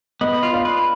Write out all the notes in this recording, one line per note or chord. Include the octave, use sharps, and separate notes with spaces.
B3 D#5
F4
D5 F5
B4